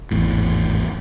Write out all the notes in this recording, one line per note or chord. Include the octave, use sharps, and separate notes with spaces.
G#1 E2 A2